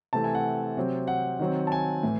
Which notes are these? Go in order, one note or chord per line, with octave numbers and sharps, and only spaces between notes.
C3 E3 A3 C4 A5
G#5
F#5
C3 F#3 C4
F#5
D#3 F#3 C4
A5
G#5
A2 E3